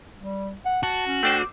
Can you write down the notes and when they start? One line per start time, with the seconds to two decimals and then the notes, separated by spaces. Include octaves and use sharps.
0.19 G3
0.65 F#5
0.83 F#4 A5
1.07 C#4
1.23 A3 D4 C5 G5
1.38 D6